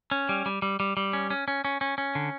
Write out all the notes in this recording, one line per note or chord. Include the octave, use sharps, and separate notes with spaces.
C#4
G3
G3
G3
G3
G3
C#4
C#4
C#4
C#4
C#4
C#4
D3